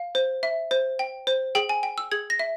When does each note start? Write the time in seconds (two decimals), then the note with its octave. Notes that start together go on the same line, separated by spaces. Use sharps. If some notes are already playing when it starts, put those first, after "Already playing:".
Already playing: F5
0.15 C5
0.43 E5
0.71 C5
0.99 G5
1.27 C5
1.55 G#4 G5
1.69 G#5
1.83 G5
1.98 E6
2.12 G#4 G#6
2.30 A#6
2.39 E5